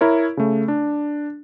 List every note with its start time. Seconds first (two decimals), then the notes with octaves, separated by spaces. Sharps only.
0.01 E4 A#4 C#5
0.37 C#3 A3
0.68 D4